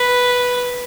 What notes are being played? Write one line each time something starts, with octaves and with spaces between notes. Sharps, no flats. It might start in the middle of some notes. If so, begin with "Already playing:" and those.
Already playing: B4